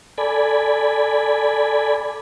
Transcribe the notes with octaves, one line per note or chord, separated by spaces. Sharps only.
A4 D5 G#5 B5